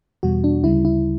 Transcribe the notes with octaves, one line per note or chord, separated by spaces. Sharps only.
E2 B2 G3 F#4
D4
D2 C#3 G3 E4
E4